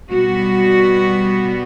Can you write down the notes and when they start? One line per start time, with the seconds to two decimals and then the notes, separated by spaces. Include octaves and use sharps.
0.11 B2 G3 B3 F#4